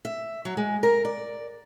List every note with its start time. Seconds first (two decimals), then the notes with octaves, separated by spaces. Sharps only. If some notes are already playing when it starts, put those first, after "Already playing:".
0.05 E5
0.45 F#3
0.57 G#3
0.83 A#4
1.05 D5